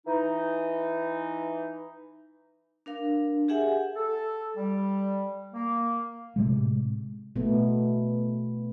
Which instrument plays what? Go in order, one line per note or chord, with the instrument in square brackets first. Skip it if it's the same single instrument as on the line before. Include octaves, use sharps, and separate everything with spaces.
[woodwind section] E3 D#4
[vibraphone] D4 A#4 F5
G4 G#4 E5 F#5 G#5
[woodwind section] A4
G3
A#3
[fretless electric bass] A2 C3 G#3
[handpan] B2 A3 B3